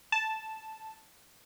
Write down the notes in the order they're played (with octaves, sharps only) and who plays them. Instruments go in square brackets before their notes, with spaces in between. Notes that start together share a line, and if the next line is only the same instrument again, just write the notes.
[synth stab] A5